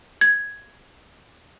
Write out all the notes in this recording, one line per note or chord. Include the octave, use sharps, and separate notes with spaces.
G#6